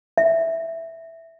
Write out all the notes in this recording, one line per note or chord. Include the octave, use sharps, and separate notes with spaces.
E5